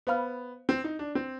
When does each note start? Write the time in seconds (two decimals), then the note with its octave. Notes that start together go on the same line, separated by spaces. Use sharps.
0.07 B3 C5 F5 B5 F6
0.69 C4
0.84 D#4
0.99 D4
1.15 C4